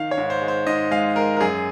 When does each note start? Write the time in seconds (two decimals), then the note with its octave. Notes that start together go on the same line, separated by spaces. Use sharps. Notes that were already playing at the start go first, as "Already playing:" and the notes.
Already playing: D#3 F5
0.11 C#5
0.18 G#2
0.30 C5
0.42 G#3
0.48 C5
0.66 G#2 D#5
0.91 G#3 F5
1.16 G#3 A#4
1.37 A#4
1.41 F#2 G#4